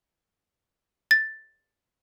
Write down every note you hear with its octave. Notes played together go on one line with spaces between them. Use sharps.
A6